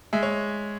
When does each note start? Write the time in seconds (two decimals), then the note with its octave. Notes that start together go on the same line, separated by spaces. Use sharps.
0.13 G#3 E5
0.23 C#5